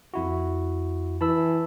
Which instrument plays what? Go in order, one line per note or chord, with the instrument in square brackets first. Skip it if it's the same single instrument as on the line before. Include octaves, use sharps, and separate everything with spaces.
[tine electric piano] F2 E4 F#4
[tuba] E3 [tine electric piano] A5 B5 E6